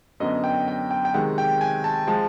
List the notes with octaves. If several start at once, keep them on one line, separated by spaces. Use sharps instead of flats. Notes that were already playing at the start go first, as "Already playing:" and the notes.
F#2 D3 F#3 B3 D#5
G5
G5
G5
G5
C3 D#3 G#3 F#5
G5
G#5
A5
F3 G#3 A5